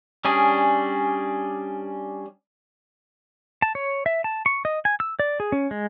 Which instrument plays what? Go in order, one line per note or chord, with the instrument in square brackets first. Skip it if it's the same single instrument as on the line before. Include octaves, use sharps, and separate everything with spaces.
[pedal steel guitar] G3 C#4 D4 G#4
A5
C#5
E5
A5
C#6
D#5
G#5
E6
D5
G#4
C#4
G#3